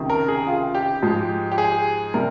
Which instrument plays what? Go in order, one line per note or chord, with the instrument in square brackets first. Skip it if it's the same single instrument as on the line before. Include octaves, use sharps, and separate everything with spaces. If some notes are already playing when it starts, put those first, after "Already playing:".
Already playing: [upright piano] C#2 C3 D#3
A#4
G#4
F4
G4
G#2 F3 G#3
G4
G#4
C3 G3 A#4